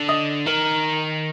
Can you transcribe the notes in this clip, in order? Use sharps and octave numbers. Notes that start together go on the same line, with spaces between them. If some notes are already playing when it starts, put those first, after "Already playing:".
Already playing: D3
D#5 D#6
D#3 A#4 A#5